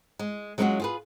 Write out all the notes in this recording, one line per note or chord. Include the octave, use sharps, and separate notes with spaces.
G#3
F#3 G#3 C#4 D#4 F4 F#4
F4 G#4 B4